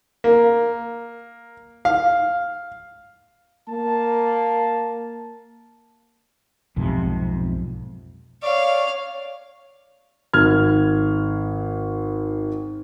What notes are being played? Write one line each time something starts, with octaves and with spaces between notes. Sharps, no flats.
A#3
F5
A#3 A5
B1 F2 G#2 C3
C#5 D5 F5 C#6
G#1 F6 G#6